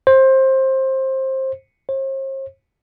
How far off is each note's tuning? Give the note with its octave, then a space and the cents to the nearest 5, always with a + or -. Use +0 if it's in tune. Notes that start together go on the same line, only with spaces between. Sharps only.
C5 +20
C5 +45